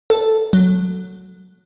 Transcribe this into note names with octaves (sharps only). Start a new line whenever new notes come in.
A4
F#3